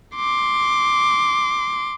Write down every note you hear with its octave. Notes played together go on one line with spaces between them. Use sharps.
C6 D6